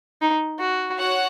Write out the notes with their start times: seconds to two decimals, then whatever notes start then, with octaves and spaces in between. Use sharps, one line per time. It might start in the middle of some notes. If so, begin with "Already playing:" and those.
0.22 D#4
0.59 F#4
0.97 F#4 C#5 F#5